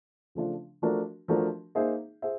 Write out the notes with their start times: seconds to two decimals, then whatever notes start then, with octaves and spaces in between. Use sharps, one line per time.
0.35 C#3 F3 A3 D4 F4
0.82 F3 A3 D4 F#4 A#4
1.28 F3 A3 D4 F#4 A#4
1.75 A#3 D#4 G#4 C5 E5
2.22 G#4 C5 E5